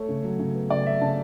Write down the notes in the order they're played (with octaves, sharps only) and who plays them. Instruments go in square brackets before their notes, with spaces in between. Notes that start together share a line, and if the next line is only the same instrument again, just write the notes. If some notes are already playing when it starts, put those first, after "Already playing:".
Already playing: [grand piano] A3 C#5
C#3
F#3
C#3
B3
C#3 D5
F#3 E5
C#3 A5